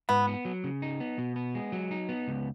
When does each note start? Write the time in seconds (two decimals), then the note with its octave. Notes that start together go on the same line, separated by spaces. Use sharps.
0.09 G#2 B3
0.27 B3
0.45 F#3
0.64 C#3
0.82 D#4
1.00 B3
1.18 B2
1.36 B3
1.55 G#3
1.72 F#3
1.91 D#4
2.09 B3
2.28 C#2